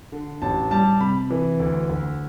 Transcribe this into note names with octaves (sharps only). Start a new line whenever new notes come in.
D3
A1 A5
G3 A5
C3 B5
E3
D2
D2